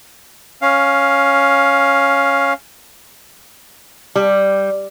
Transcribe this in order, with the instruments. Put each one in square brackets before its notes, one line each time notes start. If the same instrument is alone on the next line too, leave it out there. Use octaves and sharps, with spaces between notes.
[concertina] C#4 F5
[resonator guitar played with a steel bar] G3